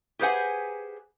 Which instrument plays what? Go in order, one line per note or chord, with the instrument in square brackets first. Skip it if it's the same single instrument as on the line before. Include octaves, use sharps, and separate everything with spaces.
[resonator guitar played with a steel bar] G4 G#4 B4 C5 F#5 G#5